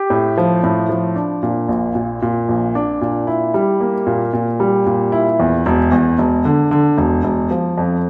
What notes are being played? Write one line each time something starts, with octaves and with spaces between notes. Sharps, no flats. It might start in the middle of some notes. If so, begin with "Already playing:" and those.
Already playing: G4
A2
F3
A2
F3
D4
A#2
A#1
A#2
A#2
A#1
D4
A#2
E4
G3
A#3
A#2
A#2
G3
A#2
E4
E2
E1
E2
E1
D3
D3
E1
E1
F3
F2